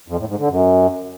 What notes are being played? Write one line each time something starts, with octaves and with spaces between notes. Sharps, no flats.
F2
A2
G#2
D3
F#2